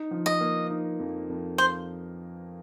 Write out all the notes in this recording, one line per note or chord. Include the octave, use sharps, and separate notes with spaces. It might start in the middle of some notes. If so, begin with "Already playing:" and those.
Already playing: D#4
F3
D#5
A#3
D#4
F2
F2
C5